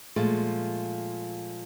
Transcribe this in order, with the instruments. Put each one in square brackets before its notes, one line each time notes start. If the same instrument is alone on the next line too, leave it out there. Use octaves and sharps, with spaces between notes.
[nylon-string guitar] A#2 F3 G#3 A3